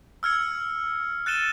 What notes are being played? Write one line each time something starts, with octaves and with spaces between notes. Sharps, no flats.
E6 F6 G#6 C#7
F#6 A6 C#7 D#7 E7 G7